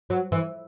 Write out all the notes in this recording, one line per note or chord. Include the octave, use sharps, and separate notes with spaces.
F#3
E3